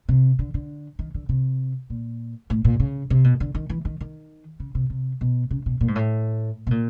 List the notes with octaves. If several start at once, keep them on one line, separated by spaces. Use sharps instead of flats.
C3
D3
D3
D#3
D3
C3
A#2
A2
A#2
C#3
C3
B2
D3
D#3
E3
D#3
D#3
C#3
C3
C3
B2
C#3
B2
A#2
G#2
A2
B2
A#2